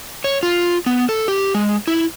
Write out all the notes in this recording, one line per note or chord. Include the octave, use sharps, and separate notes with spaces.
C#5
F4
B3
A4
G4
G#3
E4